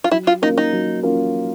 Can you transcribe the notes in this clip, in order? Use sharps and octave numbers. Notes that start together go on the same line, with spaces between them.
F4
F#3 E4
F4
A#3 C#4 D#4 F4 A#4
D#4
F#3
A#3 C#4 F4 A#4